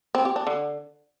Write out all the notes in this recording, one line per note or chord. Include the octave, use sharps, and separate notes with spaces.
C4
G4
D4
D3